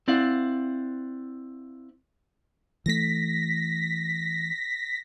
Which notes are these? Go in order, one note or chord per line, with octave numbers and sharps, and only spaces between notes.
C4 E4 D5 F5 F#5
E3 A3 A#6 B6